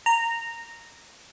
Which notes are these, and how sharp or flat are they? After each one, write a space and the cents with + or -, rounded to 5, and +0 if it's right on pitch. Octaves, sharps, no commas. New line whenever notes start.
A#5 -15